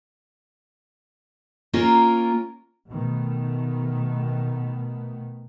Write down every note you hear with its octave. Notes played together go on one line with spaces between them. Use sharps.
A#3 C#4 F4 A#4
B2 D#3 A3 B3